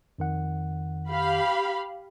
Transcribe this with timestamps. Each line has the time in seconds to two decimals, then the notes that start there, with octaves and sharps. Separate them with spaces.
0.19 F2 D#3 F#5
1.09 G4 F5 B5